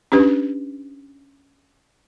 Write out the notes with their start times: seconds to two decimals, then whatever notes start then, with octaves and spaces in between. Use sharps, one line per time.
0.12 C#4 D4 G4 B4